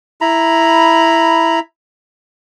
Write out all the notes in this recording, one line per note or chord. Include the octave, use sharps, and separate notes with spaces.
E4 A#5 B5